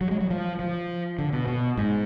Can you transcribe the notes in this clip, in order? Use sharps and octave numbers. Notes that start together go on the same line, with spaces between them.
F#3
G#3
F#3
F3
F3
D3
B2
B2
G#2